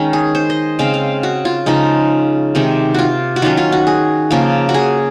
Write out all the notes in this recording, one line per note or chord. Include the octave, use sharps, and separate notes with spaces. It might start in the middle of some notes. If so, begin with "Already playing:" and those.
Already playing: D#3 G#3 C#4
G#4
C5
D#5
C#3 G#3 C4 F5
F5
F#4
F4
C#3 F3 G#3 D#4
C3 D#3 G#3 C4
F4 F#4
F#4
D#3 F#3 C#4 F4
F4
F#4
G#4
C#3 F3 A#3
F#4
G#4